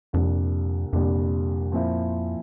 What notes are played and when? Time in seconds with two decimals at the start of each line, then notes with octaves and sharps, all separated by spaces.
0.13 C2 F2 A#2 G3 D4
0.93 C2 F2 A#2 G3 D4
1.72 A#2 F3 C4 E4